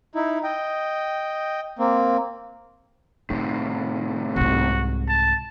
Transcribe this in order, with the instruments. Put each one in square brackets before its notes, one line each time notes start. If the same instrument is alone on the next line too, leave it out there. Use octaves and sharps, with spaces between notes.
[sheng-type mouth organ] D#4 E4
D#5 G5
A#3 C4
[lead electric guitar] A2 C3 [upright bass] D#4
[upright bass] C2 G#2 [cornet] F#4
[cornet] A5